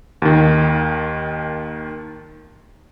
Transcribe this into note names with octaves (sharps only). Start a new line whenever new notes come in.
D#2 D#3